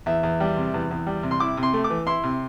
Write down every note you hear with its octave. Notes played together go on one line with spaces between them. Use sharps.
E2 E5
E2
G3
C3
E2
E2
G3
C3
C6
E4 D6
C3
C6
A3
D6
E3
E4 C6
C3